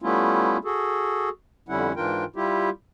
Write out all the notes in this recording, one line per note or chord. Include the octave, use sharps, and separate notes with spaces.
G3 A3 B3 C#4 E4 F4
F#4 G#4 A4
F2 D3 G3 C#4 E4 F#5
G#2 E3 D4 F4 A#4 G5
G3 E4 F4 G4